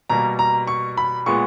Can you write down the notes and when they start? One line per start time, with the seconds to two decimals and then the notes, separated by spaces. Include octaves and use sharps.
0.10 B2 G3 A#3 A#5
0.39 A#5
0.67 C#6
0.97 B5
1.26 A#2 G#3 B3 C#6